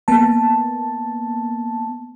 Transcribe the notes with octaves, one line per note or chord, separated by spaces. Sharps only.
A#3 B3 A5